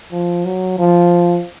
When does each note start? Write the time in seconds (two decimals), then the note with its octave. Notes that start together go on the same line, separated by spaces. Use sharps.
0.12 F3
0.45 F#3
0.78 F3